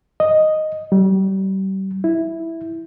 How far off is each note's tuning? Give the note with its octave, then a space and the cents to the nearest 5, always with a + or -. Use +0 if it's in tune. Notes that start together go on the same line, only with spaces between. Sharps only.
D#5 -5
G3 -35
E4 -5